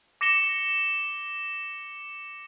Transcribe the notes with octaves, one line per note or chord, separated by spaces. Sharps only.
D6 A#6 C#7 E7 G7